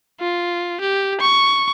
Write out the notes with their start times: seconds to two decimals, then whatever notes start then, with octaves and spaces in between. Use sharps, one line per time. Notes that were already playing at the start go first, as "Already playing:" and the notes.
0.20 F4
0.81 G4
1.20 C#6